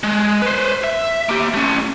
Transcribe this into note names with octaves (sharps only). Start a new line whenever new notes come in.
G#3
B4 C5
E5
A#3 G4
A3 C#4